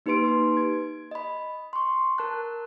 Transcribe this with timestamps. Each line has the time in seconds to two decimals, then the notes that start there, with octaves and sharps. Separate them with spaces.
0.06 A#3 D#4 G4 B4 C6 D7
0.57 G#6
1.11 D#5 B5
1.73 C6 C#6
2.18 A#4 A5 F#6